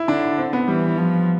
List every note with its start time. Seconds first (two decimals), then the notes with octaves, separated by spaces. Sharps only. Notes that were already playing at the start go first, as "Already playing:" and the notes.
Already playing: E4
0.08 D3 D4
0.38 C4
0.53 B3
0.68 E3 G3
0.98 F3